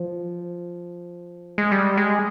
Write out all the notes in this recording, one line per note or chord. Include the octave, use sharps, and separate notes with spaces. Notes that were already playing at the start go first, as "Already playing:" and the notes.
Already playing: F3
G#3
G3
G#3